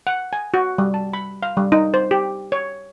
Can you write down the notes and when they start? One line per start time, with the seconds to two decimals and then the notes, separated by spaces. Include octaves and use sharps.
0.07 F#5
0.33 G#5
0.54 F#4
0.78 G3
0.94 A5
1.14 B5
1.43 F5
1.57 G3
1.72 D#4
1.94 C5
2.11 G4
2.52 C#5